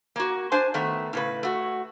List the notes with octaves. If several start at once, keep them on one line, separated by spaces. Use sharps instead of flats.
A#3 F#4
D4 C5 G#5
D#3 A3 B3
A2 C#3 B4
A3 F#4